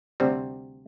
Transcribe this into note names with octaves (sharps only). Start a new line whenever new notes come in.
D2 C3 G3 C4